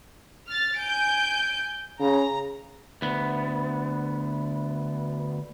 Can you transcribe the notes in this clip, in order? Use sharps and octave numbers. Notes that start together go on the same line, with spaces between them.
F6 A6
G#5 G6 D7
C#3 A#5
D2 B3